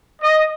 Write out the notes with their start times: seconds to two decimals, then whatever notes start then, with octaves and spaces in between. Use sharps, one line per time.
0.21 D#5